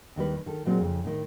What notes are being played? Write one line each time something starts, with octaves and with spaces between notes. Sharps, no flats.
D#2 D#3 G3 B4
D#3 A4
A#2 F#3 G#3 C4
F2 C#3
A2 D#3